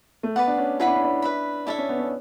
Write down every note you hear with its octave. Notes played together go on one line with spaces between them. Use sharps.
A3
B3 B4 D5 F#5
D4
C#4
E4 G#4 B4 F#5 B5
D4
C#4
D4
B4 E5 B5
D4 E4 A4 C#5 E5
C#4
B3
C#4